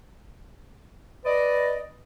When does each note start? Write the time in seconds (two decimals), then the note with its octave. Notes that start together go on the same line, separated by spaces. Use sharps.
1.25 B4 D5 D#5